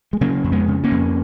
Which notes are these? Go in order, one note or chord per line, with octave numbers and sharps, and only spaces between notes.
G#3
C#3 F#3 A#3
F2
G#3 B3
C#3
A#3 C#4
F2